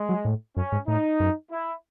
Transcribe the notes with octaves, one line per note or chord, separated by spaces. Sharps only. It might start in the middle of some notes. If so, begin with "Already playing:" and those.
Already playing: G#3
F#3
A2
F#2 C#4
G#2
A2 D#4
F#2
E4